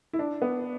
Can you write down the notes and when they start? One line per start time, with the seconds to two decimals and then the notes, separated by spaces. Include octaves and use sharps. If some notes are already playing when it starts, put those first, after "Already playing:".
0.13 E4
0.19 D4
0.42 B3